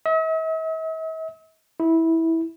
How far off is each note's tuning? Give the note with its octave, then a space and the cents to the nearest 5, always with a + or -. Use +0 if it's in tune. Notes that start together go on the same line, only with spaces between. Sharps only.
E5 -45
E4 -15